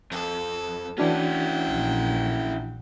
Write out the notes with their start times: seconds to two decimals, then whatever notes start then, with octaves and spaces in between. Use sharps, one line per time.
0.11 F2 A4
0.98 E3 C#4 D4 E4 F#4 F#5 G5
1.69 A#1